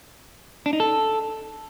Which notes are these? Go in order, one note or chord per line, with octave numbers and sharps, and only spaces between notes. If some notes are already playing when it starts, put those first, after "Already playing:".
D4
D#4
A4